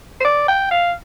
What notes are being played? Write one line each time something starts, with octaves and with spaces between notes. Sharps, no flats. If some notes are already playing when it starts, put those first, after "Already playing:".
C5
D5
G5
F5